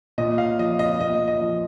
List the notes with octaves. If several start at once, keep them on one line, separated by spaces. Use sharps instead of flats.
A#2 D#5
F5
F3 D#5
D#5
A#2 D#5
D#5
F3